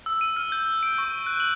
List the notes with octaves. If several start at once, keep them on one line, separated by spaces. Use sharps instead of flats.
E6
D#7
F6
G6
D7
C#6
F#6
F#7